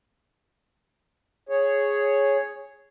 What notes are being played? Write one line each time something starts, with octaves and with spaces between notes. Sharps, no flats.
G#4 C#5